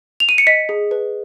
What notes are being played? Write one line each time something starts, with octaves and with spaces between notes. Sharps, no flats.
F7
D#7
C#7
D#5 B6
G#4
B4